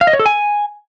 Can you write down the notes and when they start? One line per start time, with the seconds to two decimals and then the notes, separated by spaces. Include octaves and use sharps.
0.01 F5
0.07 D#5
0.13 C#5
0.19 A4
0.26 G#5